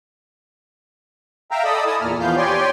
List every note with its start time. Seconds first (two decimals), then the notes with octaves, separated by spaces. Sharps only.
1.51 E5 F5 G5 A#5 E6
1.64 A4 D5 D#5 B5 D#6 E6
1.87 E4 G#5 A5 D#6 E6
2.01 E2 A#2 A#3 F6
2.20 E3 F3 B3 F5 G6
2.37 G4 C#5 D5 G5 G#5 C6